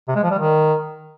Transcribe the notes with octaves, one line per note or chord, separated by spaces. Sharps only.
C3
G#3
F3
G3
D#3